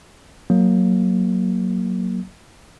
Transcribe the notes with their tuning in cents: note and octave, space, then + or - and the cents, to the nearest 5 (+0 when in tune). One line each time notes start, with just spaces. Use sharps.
F#3 +0 A#3 +0